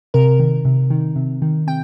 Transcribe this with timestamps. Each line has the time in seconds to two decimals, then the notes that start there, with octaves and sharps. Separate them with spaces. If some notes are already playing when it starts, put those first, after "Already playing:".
0.14 C3 A#4
0.40 D#3
0.65 C3
0.90 D#3
1.16 C3
1.42 D#3
1.67 C3 G5